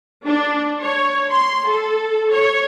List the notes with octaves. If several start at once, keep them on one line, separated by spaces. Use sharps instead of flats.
D4
C#5
C6
A4
C#5